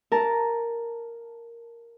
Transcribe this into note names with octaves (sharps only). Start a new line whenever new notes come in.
A#4 A5